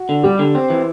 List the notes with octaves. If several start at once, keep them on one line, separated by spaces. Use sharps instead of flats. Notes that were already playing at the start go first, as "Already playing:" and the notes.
Already playing: F#4
D3
G3 G4
D3
C4
E3